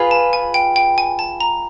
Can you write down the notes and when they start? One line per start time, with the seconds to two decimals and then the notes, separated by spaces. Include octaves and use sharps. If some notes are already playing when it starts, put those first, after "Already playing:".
Already playing: F4 G#4 B4
0.11 A5
0.33 G#5
0.54 G5
0.76 G5
0.98 G#5
1.19 A5
1.40 A#5